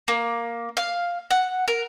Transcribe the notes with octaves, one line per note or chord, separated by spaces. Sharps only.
A#3
F5
F#5
A#4